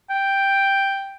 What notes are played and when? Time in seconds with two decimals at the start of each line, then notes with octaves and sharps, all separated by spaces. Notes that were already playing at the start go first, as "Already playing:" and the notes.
0.10 G5